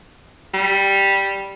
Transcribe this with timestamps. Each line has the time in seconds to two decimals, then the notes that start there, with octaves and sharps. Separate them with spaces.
0.54 G3